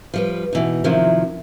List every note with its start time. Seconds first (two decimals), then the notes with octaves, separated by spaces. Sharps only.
0.14 F3 G3 B4
0.53 B2 E3 D#4
0.84 C3 D#3 F3 F#3 E4